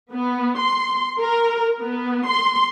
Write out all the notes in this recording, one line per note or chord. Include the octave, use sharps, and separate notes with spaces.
B3
C6
A#4
B3
C6